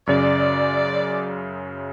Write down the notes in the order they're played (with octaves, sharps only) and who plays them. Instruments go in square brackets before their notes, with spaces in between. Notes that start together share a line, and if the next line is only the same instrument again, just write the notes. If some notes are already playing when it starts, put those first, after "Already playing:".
[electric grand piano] F#2 C#3 C#4 [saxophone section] D5